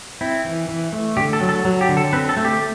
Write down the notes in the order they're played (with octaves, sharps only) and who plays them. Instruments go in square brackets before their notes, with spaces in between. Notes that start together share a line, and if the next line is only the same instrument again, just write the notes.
[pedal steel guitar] C4 E4
E3
E3
A3
D3 G4
A4
F#3
A4
F#3
G4
D3
A4
C4 B4
A4
A3
G4